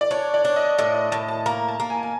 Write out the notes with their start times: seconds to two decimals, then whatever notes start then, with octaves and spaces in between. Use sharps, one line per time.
0.01 D5
0.11 D4 C#5
0.34 D5
0.45 D4
0.56 D#5
0.78 A2 D#5
0.94 D#5
1.12 A2 A5
1.28 A5
1.46 A#3 A#5
1.68 A5
1.80 A#3
1.90 G#5
2.03 G#5